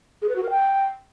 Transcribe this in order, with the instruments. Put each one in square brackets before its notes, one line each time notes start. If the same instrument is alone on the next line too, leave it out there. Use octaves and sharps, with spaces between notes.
[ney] G#4
B4
F#4
A#4
G5